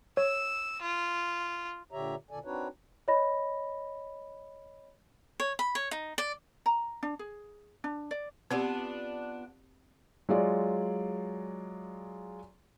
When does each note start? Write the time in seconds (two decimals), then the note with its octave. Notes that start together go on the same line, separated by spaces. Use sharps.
0.17 C#5 E6
0.82 F4
1.91 A#2 D3 G4 C#5 E5 A#5
2.30 F2 A#2 D3 A4 D5 G#5
2.45 C4 D4 D#4 F#4 B4 C#5
3.08 C#5 D#5 B5 A#6
5.40 C#5
5.59 B5
5.75 C#5
5.91 D#4
6.18 D5
6.66 A#5
7.03 D4
7.19 G#4
7.84 D4
8.11 D5
8.51 B3 C4 D4 F4 G4
10.29 F#3 G#3 F4 D5